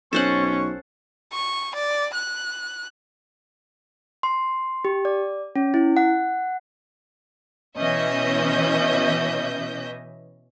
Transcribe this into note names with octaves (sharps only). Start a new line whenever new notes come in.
B1 C#4 A4 C5 F#5 C#6
C#6
D5
F#6
C6
G4
D5
C#4
E4
F#5
B2 E3 C#4 D#5 E5 G6